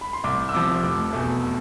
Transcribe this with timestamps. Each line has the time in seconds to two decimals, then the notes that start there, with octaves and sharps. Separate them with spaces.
0.01 B5
0.13 C6
0.24 C2 D6
0.49 E6
0.54 C3 F3 D6
0.83 F1 D6
1.13 E2 B2 A3